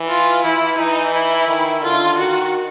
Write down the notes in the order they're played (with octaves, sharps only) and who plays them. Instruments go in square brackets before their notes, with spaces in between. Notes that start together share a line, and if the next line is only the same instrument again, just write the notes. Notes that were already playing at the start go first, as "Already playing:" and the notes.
Already playing: [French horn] E3
[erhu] F4
[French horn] E3 [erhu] E4
[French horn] E3 [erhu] D#4
[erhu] E4
[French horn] D#3
[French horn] D3 [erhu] F4
[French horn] D#3 [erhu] F#4